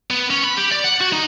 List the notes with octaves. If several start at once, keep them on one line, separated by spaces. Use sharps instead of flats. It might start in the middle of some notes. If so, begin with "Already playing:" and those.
B3
C#4
B5
G4
D5
F#5
F#4
D#4